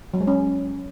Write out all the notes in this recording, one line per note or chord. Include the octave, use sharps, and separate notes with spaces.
F#3
G#3
C#4